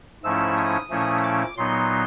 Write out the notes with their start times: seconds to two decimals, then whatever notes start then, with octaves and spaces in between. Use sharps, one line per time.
0.23 G#2 F3 A3 C#4 E4 E6
0.57 D#6
0.90 A#2 F3 A3 C#4 E4
1.24 D6
1.57 A#2 F#3 B3 D#4 C6